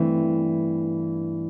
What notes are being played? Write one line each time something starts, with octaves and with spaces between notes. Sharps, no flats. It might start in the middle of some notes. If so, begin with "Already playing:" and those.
Already playing: G2 E3 A3 C4